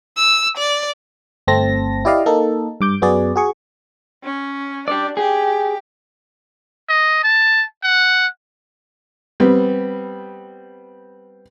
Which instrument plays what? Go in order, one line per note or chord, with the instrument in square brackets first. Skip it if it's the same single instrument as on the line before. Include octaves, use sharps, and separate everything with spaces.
[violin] E6
D5
[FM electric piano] G1 A3 C4 A5 A#6
E4 G4 D5 D#5 F5
A#3 D#4 A4
G2 D6 G6
F#2 B3 F#4 G#4 D5
F#4 G#4 C#6
[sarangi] C#4
[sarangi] D4 [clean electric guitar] G4 D5
[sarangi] G4 [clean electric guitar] G#4
[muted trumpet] D#5
A5
F#5
[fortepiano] G3 B3 C4